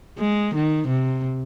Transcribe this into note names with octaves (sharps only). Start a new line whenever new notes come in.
G#3
D#3
C3